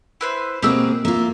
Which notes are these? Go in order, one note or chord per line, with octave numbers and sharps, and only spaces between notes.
E4 B4 C5
B2 A#3 C4 G4 G#4 E6
A#3 F4 E5